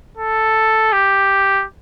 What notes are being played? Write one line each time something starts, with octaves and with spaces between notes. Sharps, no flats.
A4
G4